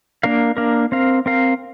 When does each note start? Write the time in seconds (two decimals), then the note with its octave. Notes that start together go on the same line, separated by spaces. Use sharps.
0.23 A#3 D4 A#4 F5
0.57 A#3 D4 A#4 F5
0.92 C4 A#4 F5
1.26 C4 A#4 F5